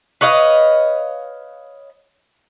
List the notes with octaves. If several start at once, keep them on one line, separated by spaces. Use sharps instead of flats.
B4 C#5 D#5 F5